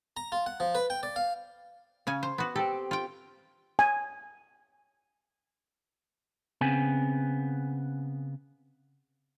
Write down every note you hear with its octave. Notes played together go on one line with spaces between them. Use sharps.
A#5
F4
F#5
F3
B4
G5
D5
F5
C#3 C#4 G#5
C5
B3 F#4
C4 G4 A4
F4 G5
G#5
C#3 B3 C4 G#5